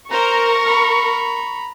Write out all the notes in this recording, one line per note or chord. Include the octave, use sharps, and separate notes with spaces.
A#4 C5 A#5 C#6
A#5 B5